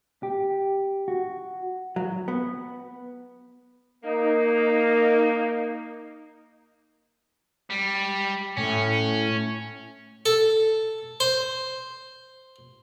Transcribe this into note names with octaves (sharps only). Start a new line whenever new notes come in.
G4
F#4
F#3
B3
A#3 D#4
G3
A2 C#4
A4
C5